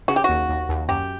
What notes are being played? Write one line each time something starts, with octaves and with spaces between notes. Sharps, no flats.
C#3 F#4
G4
D#2 F#4
D#2
D#2
F#2 G4